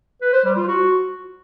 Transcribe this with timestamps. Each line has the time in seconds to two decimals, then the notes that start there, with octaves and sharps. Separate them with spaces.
0.22 B4
0.33 C5
0.45 G3
0.56 F4
0.68 F#4